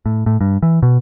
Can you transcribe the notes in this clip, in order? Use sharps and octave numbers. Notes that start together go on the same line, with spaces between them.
A2
A2
G2
E3
B2